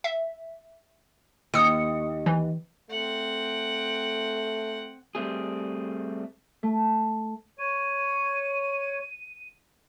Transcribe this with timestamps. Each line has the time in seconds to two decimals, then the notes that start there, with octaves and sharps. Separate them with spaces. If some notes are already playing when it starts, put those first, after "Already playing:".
0.04 E5
1.54 D#2 D#6 C#7
2.26 E3
2.90 A3 C4 F#5
5.15 G3 A3 C4 G#4
6.63 A3
7.59 C#5 D#7